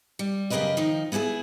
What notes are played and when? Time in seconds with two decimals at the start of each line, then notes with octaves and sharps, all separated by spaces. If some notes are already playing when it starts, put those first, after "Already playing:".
0.19 G3
0.50 F#2 C#3 G4 A#4 B4 D#5
0.77 D#3 F3 D#4
1.12 B3 E4 F#4 G#4 E5